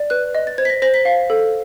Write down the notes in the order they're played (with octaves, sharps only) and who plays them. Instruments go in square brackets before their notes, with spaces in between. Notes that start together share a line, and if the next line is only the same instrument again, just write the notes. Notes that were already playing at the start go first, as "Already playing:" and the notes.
Already playing: [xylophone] D5
B4 F#6
D#5
A6
C5 G#6
B6
A#6
C5 A#6
B6
F5
A4